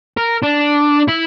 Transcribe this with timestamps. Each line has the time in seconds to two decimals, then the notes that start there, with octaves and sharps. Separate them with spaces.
0.18 A#4
0.43 D4
1.08 E4